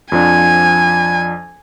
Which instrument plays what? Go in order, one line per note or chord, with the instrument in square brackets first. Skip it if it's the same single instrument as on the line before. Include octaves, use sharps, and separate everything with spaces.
[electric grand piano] F2 F3 D4 [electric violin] G#5